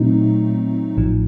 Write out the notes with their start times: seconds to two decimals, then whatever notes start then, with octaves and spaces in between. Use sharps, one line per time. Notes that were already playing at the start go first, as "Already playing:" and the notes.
Already playing: A#2 F#3 A3 C4 D#4
0.97 A1 A2 F3